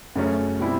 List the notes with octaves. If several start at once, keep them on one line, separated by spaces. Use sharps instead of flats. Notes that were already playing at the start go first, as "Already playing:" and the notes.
F#2 C#3 F#3 A3 C#4
B2 G3 C4 E4